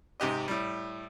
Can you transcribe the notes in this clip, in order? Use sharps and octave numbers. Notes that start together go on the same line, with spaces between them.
G#2 C3 G4 D#5
A2 G3